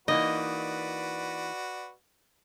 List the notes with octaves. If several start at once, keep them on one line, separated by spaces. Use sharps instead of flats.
E3 A#3 D#4 F#4 B4 D5 D#5